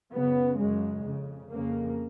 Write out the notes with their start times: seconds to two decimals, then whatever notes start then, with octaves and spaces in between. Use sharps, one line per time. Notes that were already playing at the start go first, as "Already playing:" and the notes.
0.12 F#2 C#3 B3
0.58 F#2 C#3 G#3
1.04 F2 C#3
1.50 F2 C#3 A#3